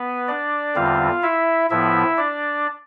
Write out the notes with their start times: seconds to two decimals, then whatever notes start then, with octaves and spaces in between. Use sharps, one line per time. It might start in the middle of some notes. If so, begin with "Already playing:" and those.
Already playing: B3 B4
0.28 D4 D5
0.75 E2 D3 G3 C4 F4 F5
1.23 E4 E5
1.70 A2 F3 B3 E4 E5
2.17 D4 D5